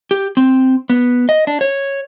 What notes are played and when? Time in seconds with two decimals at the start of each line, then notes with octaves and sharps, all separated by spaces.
0.11 G4
0.37 C4
0.90 B3
1.29 D#5
1.47 D4
1.61 C#5